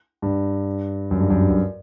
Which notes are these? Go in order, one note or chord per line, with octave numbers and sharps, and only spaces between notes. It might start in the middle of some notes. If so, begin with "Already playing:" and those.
G2
F#2
G2
F#2
G2
F#2